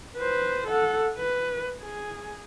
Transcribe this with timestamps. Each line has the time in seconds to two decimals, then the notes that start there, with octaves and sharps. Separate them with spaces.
0.17 B4 C5
0.68 A4 F#5
1.18 B4
1.82 G#4